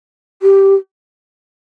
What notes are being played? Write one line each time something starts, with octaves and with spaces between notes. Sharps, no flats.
G4